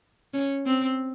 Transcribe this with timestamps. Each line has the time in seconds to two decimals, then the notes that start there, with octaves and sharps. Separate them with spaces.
0.34 C#4
0.66 C4